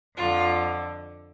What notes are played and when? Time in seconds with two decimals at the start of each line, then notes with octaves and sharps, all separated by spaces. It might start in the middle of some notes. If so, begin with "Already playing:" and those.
0.15 F2 D3 F4